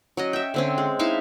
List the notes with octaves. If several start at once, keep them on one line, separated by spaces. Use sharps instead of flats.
F#3 C#4 D#5
E5 G5
D3 C4 C#4
G#3
D#4 E4 E5 F5